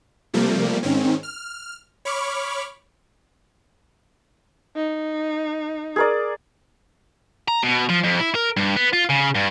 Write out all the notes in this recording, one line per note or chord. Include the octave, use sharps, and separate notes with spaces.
C3 F3 G3 A3 A#3
G#2 D#3 C4 C#4
F6
C#5 B5 C#6 D6 F6
D#4
G#4 A#4 D5
A#5
B2
F3
F2
E4
A#4
G2
B3
F4
C#3
G2